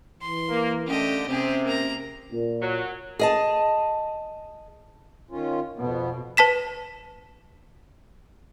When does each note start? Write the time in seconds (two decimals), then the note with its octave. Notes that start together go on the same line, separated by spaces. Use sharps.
0.21 E3 C6
0.49 A#3
0.87 D3 A3 C#4 G4 D#5
1.27 C3 C4 C#4 G4 G#4
1.64 A#3 A#5
2.30 A#2
2.61 F#3
3.19 G#4 D#5 A5
5.31 D#3 C#4 F4
5.77 F2 B2 B3
6.37 B4 A5 B6 E7